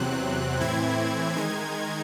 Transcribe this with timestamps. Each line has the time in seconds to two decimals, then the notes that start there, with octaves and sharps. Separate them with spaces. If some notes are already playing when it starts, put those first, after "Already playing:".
Already playing: E2 C3 F#3 C4 F#6
0.60 A2 E3 C4 E4 G#6
1.36 D#3 G#3 D#4 G#6